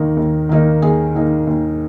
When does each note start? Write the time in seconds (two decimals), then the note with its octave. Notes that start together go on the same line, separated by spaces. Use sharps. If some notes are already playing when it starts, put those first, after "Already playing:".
Already playing: D#2 D#3 A#3 D#4
0.17 D#2
0.49 D#3 A#3 D#4
0.82 D#2 G#4
1.15 D#3 A#3 D#4
1.47 D#2